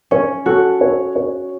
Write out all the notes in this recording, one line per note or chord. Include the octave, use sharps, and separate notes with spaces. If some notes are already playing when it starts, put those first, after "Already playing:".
C#4 C#5
F#4 A4
C#5
C#5